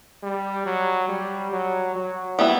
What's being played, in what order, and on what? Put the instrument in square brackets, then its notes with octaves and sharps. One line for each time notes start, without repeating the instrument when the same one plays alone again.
[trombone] G3
F#3
G3
F#3
F#3
[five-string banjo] G3 B3 E4